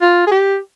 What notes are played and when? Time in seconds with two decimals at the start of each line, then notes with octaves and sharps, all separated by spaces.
0.02 F4
0.27 G#4
0.31 G4